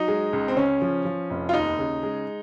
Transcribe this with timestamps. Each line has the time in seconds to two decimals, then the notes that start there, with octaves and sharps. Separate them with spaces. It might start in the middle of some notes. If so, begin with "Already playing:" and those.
Already playing: F#3 D#4
0.08 G#3
0.33 C#2
0.48 C4
0.56 C#3 C#4
0.82 F3
1.05 F3
1.30 F1
1.49 F4
1.54 D#2 D#4
1.79 C#3
2.03 G#3